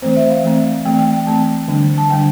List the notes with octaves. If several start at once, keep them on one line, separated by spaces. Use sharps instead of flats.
E3 A3 C4 C5
E5
F5
E3 A3 C4
E3 A3 C4 G5
G5
G5
E3 A3 C4 A5
D3 G3 D4
A5
D3 G3 D4 G5